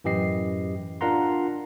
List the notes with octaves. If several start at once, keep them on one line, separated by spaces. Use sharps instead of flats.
F#2 A2 E3 G4 D#5 C7
D4 F4 A#4 F#5 A#5 C6